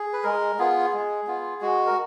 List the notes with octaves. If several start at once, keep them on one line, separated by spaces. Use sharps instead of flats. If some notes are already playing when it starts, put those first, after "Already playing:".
Already playing: G#4
B4
G#3 A#4
B3 F4 G#4
G#3
B3 F4
G#3 F#4
A#4